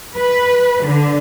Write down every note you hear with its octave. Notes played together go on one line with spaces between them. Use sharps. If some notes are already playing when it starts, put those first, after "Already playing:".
B4
D3